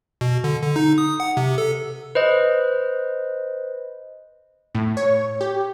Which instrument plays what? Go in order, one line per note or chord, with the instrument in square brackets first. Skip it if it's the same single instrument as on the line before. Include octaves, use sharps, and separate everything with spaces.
[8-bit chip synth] B2
D3
D3
D#4
D#6
F#5
C3
A4
[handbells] B4 C5 D#5
[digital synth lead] A2
C#5
G4